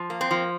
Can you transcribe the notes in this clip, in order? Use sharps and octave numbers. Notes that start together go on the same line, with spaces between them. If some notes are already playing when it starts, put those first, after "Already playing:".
Already playing: F3
A#3
C4
F3